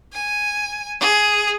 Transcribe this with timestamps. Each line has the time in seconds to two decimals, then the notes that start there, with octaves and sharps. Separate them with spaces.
0.13 G#5
1.00 G#4